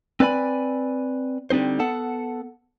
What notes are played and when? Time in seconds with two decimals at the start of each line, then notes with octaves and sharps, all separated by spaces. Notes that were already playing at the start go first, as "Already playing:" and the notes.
0.20 C4 B4 D5 G#5 B5
1.50 D3 G3 C4 D#4 C5
1.80 B3 A4 F#5 A5